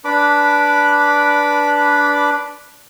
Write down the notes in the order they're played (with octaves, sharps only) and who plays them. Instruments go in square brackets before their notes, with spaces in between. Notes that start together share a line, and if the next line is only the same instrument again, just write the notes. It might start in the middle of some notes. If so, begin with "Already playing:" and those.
[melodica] D4 B4 B5 D6